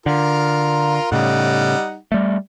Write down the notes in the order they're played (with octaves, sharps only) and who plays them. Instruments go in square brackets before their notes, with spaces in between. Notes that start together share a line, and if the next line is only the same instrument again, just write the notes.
[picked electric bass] D3 [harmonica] F4 A#4
[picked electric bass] A2 C#3 [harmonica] G3 D#4 F#5
[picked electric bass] G3 A3